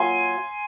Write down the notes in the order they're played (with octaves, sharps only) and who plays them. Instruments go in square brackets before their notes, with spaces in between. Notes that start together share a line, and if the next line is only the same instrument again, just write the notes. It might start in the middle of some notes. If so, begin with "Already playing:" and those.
Already playing: [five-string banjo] F#3 A#3 F4 [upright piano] G#5 C6